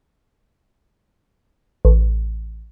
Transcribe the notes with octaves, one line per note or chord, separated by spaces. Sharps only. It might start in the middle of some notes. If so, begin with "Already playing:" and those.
A1